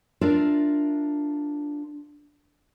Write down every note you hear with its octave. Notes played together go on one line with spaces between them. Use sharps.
D4 F4 A#4 D5 E5